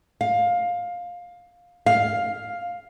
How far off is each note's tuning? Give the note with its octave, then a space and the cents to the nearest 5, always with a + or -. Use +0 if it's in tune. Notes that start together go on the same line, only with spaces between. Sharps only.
F5 +15
F5 +5